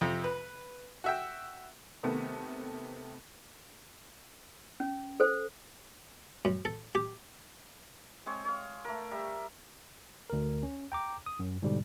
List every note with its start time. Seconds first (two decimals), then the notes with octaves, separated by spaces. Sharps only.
0.01 F2 C3
0.24 B4
1.04 F#4 E5 G5
2.03 C3 D#3 A3 B3
4.80 C#4
5.20 A4 C5
6.45 F#2
6.65 A4
6.95 G4
8.26 G#3 C4 C#5
8.45 C#5 F5
8.85 A3 A#4
9.11 G3 A#4 E5
10.30 D2 A#4
10.63 C#4
10.92 G5 A#5 D6
11.26 D#6
11.39 F#2
11.62 G#2 B2 D3 G3